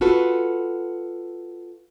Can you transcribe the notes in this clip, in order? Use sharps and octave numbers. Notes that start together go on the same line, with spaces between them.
F4 F#4 A4 B4